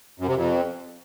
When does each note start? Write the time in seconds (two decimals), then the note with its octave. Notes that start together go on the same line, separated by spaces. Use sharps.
0.20 F#2
0.27 C3
0.35 F2